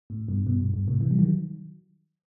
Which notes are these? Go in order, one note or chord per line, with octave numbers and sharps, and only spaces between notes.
A2
G2 B2
G2 B2
G2
G2
A2 C3
C3 E3
G3
D#3 F#3